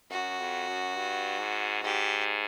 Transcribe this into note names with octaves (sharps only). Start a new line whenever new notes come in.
F#2 F#4
F2
F#2
G2
G#2
G#2 G4